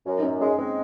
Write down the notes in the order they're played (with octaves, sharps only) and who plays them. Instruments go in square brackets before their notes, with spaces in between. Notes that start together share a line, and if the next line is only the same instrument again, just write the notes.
[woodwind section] F#2
[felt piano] D#4
[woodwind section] F#2 [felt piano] C#4
[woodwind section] G#3 [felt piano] C#4
[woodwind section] G#3 [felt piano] C4